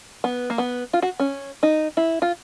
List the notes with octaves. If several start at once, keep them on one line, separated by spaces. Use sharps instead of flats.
B3
A#3
B3
F4
F#4
C#4
D#4
E4
F4